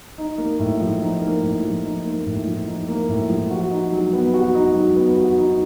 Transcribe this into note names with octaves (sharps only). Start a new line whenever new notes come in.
D#4
A#3
A2
F3
D#4
A#3
A2
F3
D#4
A#3
A2
F3
D#4
A#3
A2
F3
F#4
D#4
F#3
B3
F#4
D#4
F#3
B3
F#4
D#4